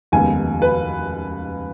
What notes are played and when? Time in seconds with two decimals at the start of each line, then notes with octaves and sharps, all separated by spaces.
0.12 F1 D#2 C#3 G#3 B3 G#5
0.62 B4